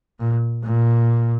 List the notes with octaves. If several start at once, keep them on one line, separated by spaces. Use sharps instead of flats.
A#2
A#2